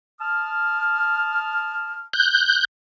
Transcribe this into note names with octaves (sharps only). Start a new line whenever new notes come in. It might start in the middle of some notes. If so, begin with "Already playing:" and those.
A5 D#6 F6
F#6 G6